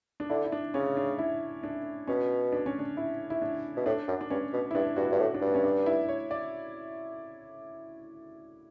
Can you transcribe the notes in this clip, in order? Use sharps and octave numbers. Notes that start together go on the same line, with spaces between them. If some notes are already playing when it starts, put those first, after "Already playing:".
D4
D3 E4
E4
D4
C#3 C#4
D4
E4
D4
B2 C#4
D4
C#4
D4
E4
E4
D4
B2
A2 D4
F#2
D4
G2 C#4
B2
E4
G2 D4
G2 F#4
E4
G2
A2
D4
G2
C#4
D4
E4
C#5
D5